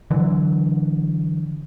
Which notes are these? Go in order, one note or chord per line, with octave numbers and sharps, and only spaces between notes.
D3 E3 F#3